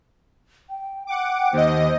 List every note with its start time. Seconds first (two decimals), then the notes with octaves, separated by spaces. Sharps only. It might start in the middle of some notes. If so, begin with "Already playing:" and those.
0.70 G5
1.07 F#5 G5 D6
1.53 D#2 C5 D#5